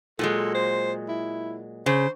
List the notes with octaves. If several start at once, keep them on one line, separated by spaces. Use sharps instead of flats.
A#2 F#3 G#3 A4
C5
E4
C#3 C5